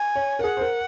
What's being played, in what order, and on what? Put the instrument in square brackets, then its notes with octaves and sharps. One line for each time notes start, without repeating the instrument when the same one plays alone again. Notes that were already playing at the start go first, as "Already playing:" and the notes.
Already playing: [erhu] G#5
[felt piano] C#5
A#4
[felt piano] G#4 [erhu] F#5
[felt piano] C5
A#4